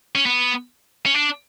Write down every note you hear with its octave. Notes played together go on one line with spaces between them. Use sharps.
C#4
B3
C#4
D4